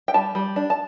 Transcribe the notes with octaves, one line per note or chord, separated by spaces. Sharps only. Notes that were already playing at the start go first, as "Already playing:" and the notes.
G5
G3 A5
G3
D4
A5